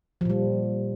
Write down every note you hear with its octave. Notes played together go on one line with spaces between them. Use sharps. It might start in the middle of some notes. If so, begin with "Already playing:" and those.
A#2 F3 G3